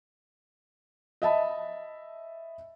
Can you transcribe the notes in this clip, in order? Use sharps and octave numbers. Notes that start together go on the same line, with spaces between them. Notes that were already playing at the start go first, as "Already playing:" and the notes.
D#5 E5 A5 B5